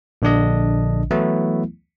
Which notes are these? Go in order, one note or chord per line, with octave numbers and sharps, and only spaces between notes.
A#1 D3 D4 D#5
E3 F#3 A3 B3 E4